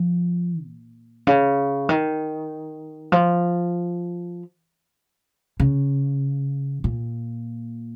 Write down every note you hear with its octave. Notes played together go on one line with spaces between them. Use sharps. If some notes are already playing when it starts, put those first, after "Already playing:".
Already playing: F3
A#2
C#3
D#3
F3
C#3
A#2